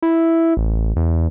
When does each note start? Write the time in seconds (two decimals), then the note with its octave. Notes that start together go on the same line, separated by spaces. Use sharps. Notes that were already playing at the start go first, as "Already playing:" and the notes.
0.02 E4
0.57 A1
0.96 E2